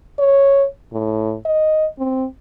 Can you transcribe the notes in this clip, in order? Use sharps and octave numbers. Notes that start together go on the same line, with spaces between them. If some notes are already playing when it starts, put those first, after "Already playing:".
C#5
A2
D#5
C4